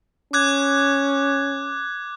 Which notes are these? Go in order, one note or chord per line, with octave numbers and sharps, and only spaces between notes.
C#4 D6 F#6 G#6